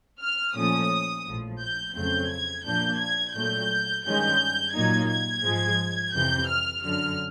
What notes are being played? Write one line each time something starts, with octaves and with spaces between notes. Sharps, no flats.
F6
A#2 F3 A3 C#4 D#6
A#1 A2 F3
G6
F2 C#3 F#3 A3 C4 G6
G#6
A#2 F3 A#3 D4 G6
G#6
A#2 F#3 A3 G6
G2 D#3 G#3 C#4 G6
A#2 F#3 A#3 D#4 G#6
G#6
G#2 F3 G#3
F2 C3 E3 G6
F6
F#2 D3 F#3 F6